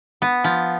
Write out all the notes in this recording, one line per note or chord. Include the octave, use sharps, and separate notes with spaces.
B3
F3